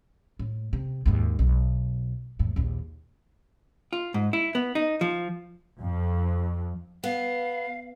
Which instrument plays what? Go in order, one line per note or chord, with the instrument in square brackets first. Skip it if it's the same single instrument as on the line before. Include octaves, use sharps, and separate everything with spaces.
[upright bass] A2
C3
D#2 G#2
B1
E2 A2
A#1 D#2
[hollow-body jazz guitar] F4
G#2
E4
B3
D#4
F3
[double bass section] F2
[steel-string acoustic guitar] B3 [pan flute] F5